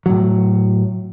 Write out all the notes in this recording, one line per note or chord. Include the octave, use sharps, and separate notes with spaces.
A2 F#3